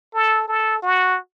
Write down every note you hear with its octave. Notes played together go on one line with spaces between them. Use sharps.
A4
A4
F#4